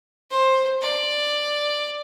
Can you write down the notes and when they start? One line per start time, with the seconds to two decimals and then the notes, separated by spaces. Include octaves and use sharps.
0.30 C5
0.81 D5